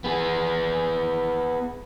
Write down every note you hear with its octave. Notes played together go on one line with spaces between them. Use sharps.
B3 G#4